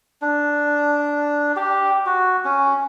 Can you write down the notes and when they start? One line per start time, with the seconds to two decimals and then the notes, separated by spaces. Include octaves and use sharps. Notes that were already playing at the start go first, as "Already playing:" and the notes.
0.22 D4
1.56 G4
2.06 F#4
2.45 C#4